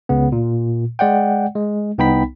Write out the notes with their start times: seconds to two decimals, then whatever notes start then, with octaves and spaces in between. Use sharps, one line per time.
0.09 C#2 C#3 B3
0.32 A#2
0.99 G#3 D5 F#5 G5
1.55 G#3
1.98 C2 B3 D#4 G5 B5 B6